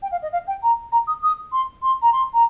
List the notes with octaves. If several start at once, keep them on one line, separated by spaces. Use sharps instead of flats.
G5
F5
D#5
F5
G5
A#5
A#5
D#6
D#6
C6
C6
A#5
C6
A#5